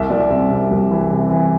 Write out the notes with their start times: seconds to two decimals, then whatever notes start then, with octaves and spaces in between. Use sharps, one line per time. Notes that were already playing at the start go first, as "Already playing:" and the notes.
Already playing: C2 E5
0.10 C2 D5
0.30 C3 E5
0.50 C3
0.71 C2
0.91 E3
1.11 C3
1.30 E3